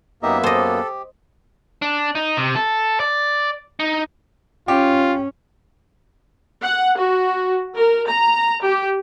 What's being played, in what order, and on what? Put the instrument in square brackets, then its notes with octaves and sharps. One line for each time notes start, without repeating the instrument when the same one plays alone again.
[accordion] F#2 A#3 B3 [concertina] D#4 G4 D#5 [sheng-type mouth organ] E5
[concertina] G4 [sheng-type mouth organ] A4 [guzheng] C5 D#5
[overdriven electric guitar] D4
D#4
C3
A4
D5
D#4
[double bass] C#4 [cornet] F4 [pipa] G4
[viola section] F#5
F#4
A#4
A#5
G4